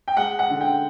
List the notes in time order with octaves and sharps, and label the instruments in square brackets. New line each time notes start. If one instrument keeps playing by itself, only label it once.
[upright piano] G5
G#3 F#5
F#5
D3
G5